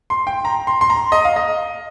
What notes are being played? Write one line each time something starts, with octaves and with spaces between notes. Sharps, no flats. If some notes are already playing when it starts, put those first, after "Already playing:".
C6
G5
A#5
C6
C6
A#5
D#5
F5
D#5